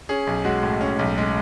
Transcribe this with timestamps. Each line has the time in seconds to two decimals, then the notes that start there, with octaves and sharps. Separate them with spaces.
0.09 C#4 G#4
0.27 B1
0.45 G#3 F#4
0.63 A2
0.81 C#4
0.99 B1
1.18 G#3